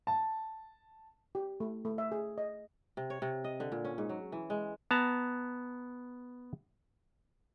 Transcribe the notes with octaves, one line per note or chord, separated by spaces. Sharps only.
A5
G4
A3
A3
E5
G#4
D#5
C3
C#5
C3
D#5
D3
A#2
C#4
G#2
F#3
E3
G#3
B3 A5 A#5